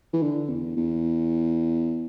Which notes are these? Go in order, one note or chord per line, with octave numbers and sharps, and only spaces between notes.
E3
D3
E2
E2